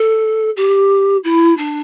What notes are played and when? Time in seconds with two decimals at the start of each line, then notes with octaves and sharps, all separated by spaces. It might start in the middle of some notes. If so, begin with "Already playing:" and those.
Already playing: A4
0.56 G4
1.24 E4
1.58 D4